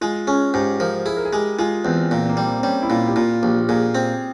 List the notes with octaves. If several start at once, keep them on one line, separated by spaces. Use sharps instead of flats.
G#3 F4
C#4 G#4
G#2 G4
F3 A#4
E4 G#4
A#4
G#4
G#3 G4
G#3 F4
E2 C4
A#2 C4
A#3
G3
C4
C4
G3 C#4
E4
A#2 F4
G4
A#2 F4
A#1 G4
A#2 G#4
C4